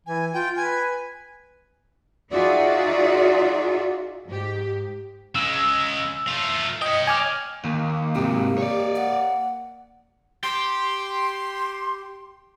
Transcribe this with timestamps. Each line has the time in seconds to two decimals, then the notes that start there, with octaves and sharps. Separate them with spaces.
0.07 E3 G#5
0.33 F4 G5
0.56 B4 G#5
2.31 D#4 F4 F#4 G#4 D5 E5
4.27 G#2 G4
5.35 C#3 G#3 E6
6.27 A3 F4
6.82 C#5 D#5 G5
7.07 G#5 D6 F6
7.64 D#2 A#3
8.16 G#2 C3 G4
8.58 C#5 D5
8.96 F#5
10.43 G4 C6